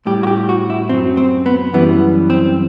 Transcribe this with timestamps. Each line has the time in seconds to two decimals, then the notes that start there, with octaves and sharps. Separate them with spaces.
0.06 A2 G3 G4
0.23 F#4
0.27 G4
0.49 F#4
0.70 E4
0.89 F#2 F#3 C4
1.17 C4
1.46 B3
1.73 F#2 E3 G3 B3
2.30 C4